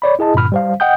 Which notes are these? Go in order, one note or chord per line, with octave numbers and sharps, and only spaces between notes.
C#5 D5 B5
E4 G#4 D#5 A5
G2 A#2 D3 B5 F6
G3 C5 F5
D#5 F#5 G5 D#6 G6